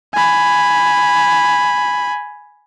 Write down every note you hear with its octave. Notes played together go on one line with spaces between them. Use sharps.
G#5 B5